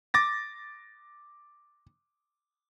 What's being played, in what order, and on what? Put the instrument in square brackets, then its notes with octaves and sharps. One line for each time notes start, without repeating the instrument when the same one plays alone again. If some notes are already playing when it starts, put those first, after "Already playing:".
[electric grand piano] D6 A6 A#6